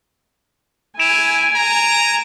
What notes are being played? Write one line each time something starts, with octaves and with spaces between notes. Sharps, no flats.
E4 G#5 D7 E7 F7
A#5